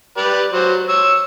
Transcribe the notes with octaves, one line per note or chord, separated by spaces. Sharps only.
G4 B4 D5
F#3 C5
C#5 E6